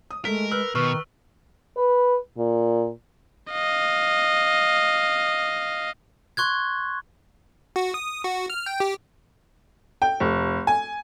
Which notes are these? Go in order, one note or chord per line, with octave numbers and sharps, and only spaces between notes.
D#6
G#3 A3 A#4 B6
B4 E6 F6
B2 D#3 B4 C#6 F6
B4
A#2
D#5 F5
C6 C#6 F#6 G#6
F#4
D#6
F#4
F6
G5
G4
G5
F1
G#5